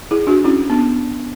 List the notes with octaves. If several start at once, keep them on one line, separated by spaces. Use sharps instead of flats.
E4 G#4
D4 F#4
C#4 E4
B3 D4